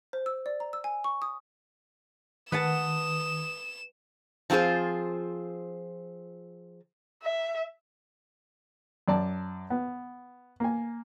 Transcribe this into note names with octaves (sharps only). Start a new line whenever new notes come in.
C5
E6
D5
A#5
E6
G#5
C#6
D#6
D#3 B4 F#5 A5 D#6 E7
F3 C4 F4 G#4 C5
E5
F#2 D5 A5
B3
A#3 G#5